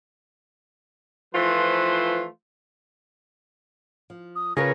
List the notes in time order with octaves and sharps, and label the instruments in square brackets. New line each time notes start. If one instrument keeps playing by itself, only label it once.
[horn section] E3 F3 A3 F4 B4 C5
[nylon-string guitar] F3
[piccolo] D#6
[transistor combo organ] C#3 [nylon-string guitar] F4 C#5 [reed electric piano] G#4 A#4 B4 [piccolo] A#6